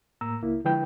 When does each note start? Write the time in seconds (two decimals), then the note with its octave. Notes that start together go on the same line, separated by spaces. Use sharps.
0.21 A2 A#3 A#5 E6
0.42 C#2 A#3 E4
0.65 D3 F3 G#3 E4 B4 G5